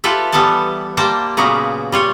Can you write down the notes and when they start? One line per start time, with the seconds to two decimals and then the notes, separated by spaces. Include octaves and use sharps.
0.04 F4 G4 A4 B4 E5
0.32 E3 G3 B3 A4 G#5 A5
0.97 G3 A#3 C5 G5 A5
1.37 A#2 C#3 F#3 A#3 B3
1.92 G3 F4 C#5